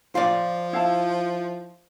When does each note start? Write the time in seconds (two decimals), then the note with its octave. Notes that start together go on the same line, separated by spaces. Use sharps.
0.15 F3 F4 D5
0.73 E4 F5 A5